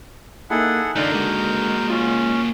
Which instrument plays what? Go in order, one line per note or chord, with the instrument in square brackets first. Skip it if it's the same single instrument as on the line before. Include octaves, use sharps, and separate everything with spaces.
[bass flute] A#3 [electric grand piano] D#4 E4 [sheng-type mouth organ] G#4 A4 F#5
[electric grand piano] D3 D#4 [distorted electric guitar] A3 F4 [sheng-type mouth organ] A#4 A#5 G6 [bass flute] D5
[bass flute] G#3 [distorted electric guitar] A#3 F#4
[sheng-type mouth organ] C#4 [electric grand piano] F4